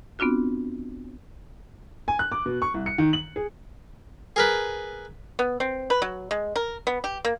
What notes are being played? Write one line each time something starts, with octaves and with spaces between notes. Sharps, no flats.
B3 C4 D4 F4 F#4
G#5
F#6
D6
B2
C#6
C2
C#7
D#3
F#7
G#4
G#4 A#4 B4
B3
C4
B4
F#3
G#3
A#4
B3
G4
A#3